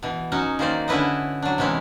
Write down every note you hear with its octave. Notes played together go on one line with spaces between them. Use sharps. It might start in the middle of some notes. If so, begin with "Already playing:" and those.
B2 E3
F#3 C#4 D#4 F#4
D#3 A#3 C5 D5
D3 C#4 E4 B4 D#5
F#3 D4
C3 E3 G#3 C#4 E4